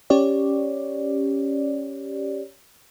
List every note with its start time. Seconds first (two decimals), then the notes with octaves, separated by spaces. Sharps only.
0.10 C#4 G4 C#5 D5